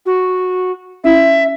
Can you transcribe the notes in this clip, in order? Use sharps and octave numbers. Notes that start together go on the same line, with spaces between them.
F#4
C#4 E4 E5